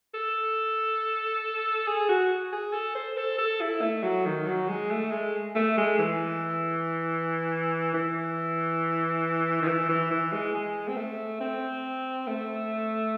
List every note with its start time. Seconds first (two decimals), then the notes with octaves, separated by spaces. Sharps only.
0.14 A4
1.87 G#4
2.09 F#4
2.52 G#4
2.73 A4
2.95 C5
3.17 A4
3.38 A4
3.61 E4
3.82 A3
4.03 F#3
4.25 D#3
4.47 F#3
4.69 G#3
4.91 A3
5.11 G#3
5.55 A3
5.77 G#3
5.99 E3
7.94 E3
9.62 D#3
9.67 E3
9.89 E3
10.11 E3
10.32 G#3
10.54 G#3
10.88 C4
10.96 A3
11.40 C4
12.27 A3